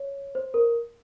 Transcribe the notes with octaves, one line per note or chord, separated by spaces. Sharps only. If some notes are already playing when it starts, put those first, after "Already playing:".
Already playing: C#5
C5
A#4